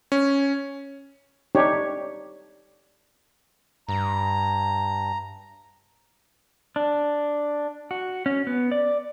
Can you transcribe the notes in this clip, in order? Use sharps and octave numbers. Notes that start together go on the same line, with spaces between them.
C#4
D4 D#4 G4 C#5
G2 A#5
D4
F#4
C#4
B3
D5